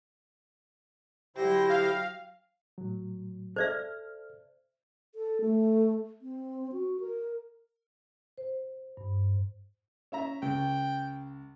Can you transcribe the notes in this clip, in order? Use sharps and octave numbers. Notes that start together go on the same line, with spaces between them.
D3 F#3 E4 G4 C5 G5 A#6
F5
A2 F#3
A4 C5 D5 E5 F6
A4
A3
C4
F#4
A#4
C5
G2
C#4 E5 A#5
C#2 G5